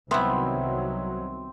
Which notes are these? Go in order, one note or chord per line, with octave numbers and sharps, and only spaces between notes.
C2 D#3 F#3 B3 C4 E4 E5 C6